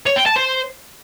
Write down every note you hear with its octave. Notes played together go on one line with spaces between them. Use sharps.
C#5
G5
A5
C5